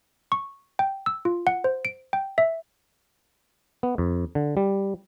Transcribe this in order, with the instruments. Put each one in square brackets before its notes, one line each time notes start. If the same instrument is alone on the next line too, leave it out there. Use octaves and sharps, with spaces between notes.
[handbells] C#6
G5
E6
F4
F#5
C5
D7
G5
E5
[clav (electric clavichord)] B3
F2
D3
G3